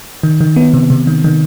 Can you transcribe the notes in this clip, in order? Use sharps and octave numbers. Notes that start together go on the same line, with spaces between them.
D#3
D#3
B3
C3
C3
D#3
D#3